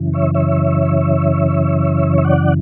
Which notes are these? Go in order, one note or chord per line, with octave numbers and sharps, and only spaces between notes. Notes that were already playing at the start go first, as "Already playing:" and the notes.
Already playing: F#2 C#3 E3
C#5 E5
C#5 E5
E5
D5 F#5